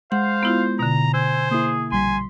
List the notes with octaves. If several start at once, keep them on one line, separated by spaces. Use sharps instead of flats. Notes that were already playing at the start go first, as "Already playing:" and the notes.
G#3 C5 F5 F#5
B3 E4 F4
B2 D3 A#5
C5 G#5 E6
A#3 E4 G#4
A#1 G3 G#5 C6 B6